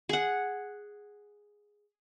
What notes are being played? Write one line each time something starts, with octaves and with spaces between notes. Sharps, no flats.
G#4 F#5